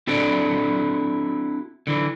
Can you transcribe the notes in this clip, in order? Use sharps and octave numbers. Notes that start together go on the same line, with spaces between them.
C4 D4 E4 F#4 A4 D5
D3 E3